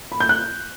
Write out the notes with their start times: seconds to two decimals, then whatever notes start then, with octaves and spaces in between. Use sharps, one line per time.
0.12 B5
0.20 G6
0.29 F#6